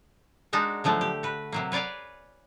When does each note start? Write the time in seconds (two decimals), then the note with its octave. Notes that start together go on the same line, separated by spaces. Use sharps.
0.53 G#3 D4 D#4 F#4 A#4
0.84 D3 F3 F#3 A3
1.01 G4
1.23 F#4 B4
1.52 C3 F#3 A#3
1.72 B4 C#5 D5 F5 G#5